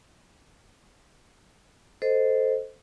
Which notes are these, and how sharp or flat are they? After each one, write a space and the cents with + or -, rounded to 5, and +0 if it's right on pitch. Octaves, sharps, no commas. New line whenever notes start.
A4 +0 C5 -10 D#5 +0